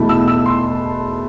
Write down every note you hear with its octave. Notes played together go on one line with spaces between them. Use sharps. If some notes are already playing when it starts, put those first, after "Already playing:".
Already playing: E2 B2 A3 E4
E6
E6
C6